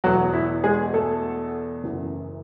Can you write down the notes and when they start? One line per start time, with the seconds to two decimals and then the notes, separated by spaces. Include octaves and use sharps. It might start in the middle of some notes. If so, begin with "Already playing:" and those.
0.04 E2 B2 F#3 A3 F#4
0.33 E4
0.64 G#3 G#4
0.94 A3 A4
1.84 F#1 F#2 E3 A3